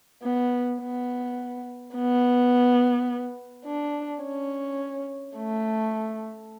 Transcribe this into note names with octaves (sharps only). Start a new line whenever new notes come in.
B3
B3
B3
D4
C#4
A3